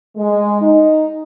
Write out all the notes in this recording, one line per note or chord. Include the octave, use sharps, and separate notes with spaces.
G#3
D#4